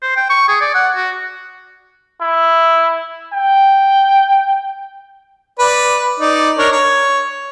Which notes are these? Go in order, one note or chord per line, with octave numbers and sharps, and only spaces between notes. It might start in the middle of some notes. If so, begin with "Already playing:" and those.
C5
G5
C#6
G#4
D5
F#5
F#4
E4
G5
B4 D5
D#4 D5
D4 A#4 C#5
C#5